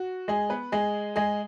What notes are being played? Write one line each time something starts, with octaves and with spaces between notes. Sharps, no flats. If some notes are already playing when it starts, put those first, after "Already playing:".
Already playing: F#4
G#3 G#4
B3 B4
G#3 G#4
G#3 G#4